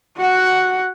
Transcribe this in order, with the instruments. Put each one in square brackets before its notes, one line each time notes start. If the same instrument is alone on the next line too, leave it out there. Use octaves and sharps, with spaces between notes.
[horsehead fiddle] F#4 F#5